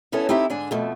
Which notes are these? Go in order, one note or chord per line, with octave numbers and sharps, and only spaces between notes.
G2 B3 C#4 E4 A4
C4 D#4 E4 G4 A4 E5
G#2 D3 D4 G#5
F2 B2 A3